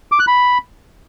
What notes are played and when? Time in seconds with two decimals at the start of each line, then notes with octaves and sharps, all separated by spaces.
0.12 D6
0.20 F#6
0.27 B5